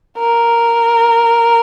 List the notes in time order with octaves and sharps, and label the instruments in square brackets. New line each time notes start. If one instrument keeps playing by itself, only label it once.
[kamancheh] A#4